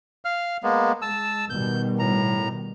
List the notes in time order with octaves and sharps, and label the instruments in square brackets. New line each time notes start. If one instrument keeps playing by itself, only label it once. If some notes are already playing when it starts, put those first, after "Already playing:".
[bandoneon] F5 F6
G#3 A#3 B3
[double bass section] G#3 [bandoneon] A5 E6
[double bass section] B2 D#3 G3 [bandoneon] G6
[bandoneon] A2 A#5